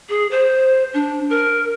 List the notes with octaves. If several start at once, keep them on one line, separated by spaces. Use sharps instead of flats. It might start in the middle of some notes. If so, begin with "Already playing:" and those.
G#4
C5
D4
A#4